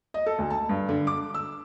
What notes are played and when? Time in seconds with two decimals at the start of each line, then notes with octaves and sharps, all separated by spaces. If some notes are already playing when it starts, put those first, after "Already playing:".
0.14 D#5
0.26 A4
0.38 D2
0.50 A5
0.69 G2
0.89 D3
1.07 D6
1.34 E6